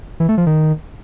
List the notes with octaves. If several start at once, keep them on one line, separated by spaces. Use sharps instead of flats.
E3
A3
F3
D#3